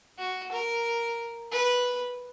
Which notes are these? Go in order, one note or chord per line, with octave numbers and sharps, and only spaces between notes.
F#4
A#4
B4